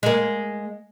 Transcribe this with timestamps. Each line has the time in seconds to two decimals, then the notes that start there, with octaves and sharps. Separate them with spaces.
0.03 G#3 A#3